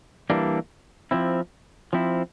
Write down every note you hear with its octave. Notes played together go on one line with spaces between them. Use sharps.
E3 G3 A#3 D4
F3 C4 E4
F3 C4 E4